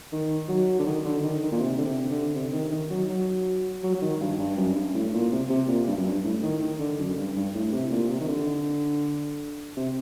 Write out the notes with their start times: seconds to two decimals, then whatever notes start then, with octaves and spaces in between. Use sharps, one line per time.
0.12 D#3
0.48 F#3
0.79 D3
0.86 D#3
1.05 D3
1.23 D#3
1.42 D#3
1.52 A#2
1.60 C3
1.78 D3
1.85 C3
2.10 D3
2.35 C3
2.53 D#3
2.72 D#3
2.90 F#3
3.09 F#3
3.84 F#3
3.94 F#3
4.02 D#3
4.20 G2
4.39 G2
4.57 F#2
4.76 G2
4.94 A2
5.13 A#2
5.31 C3
5.50 C3
5.68 A#2
5.87 G2
5.97 F#2
6.06 G2
6.24 A2
6.43 D#3
6.61 D#3
6.80 D3
6.99 F#2
7.17 G2
7.36 G2
7.55 A2
7.72 C3
7.91 A#2
8.09 C3
8.21 D#3
8.28 D3
9.77 C3